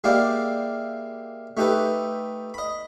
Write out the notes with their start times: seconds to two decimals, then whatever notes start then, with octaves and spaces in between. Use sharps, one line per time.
0.04 G#3 A#3 E4 G4 D5 F5
1.57 A3 D#4 G4 A4 B4
2.54 D#5 B5